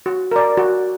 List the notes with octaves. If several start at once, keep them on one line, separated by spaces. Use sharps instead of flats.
F#4
A#4 D5
F#4